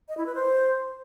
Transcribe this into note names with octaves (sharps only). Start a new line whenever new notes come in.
D#5
E4
B4
C5